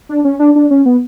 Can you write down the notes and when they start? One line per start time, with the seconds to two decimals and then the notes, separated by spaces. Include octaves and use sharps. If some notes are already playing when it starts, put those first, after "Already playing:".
0.09 D4
0.25 C#4
0.39 D4
0.55 D4
0.71 C#4
0.86 B3